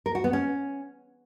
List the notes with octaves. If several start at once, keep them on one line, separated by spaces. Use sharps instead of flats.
A#4
F#4
B3
C#4